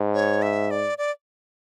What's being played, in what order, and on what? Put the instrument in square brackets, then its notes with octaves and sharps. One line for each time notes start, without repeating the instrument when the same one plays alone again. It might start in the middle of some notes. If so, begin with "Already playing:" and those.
Already playing: [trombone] G#2
[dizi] C#5
E5
D5
D5